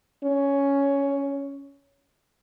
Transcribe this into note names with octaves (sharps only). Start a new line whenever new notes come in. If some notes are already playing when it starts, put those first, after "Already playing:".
C#4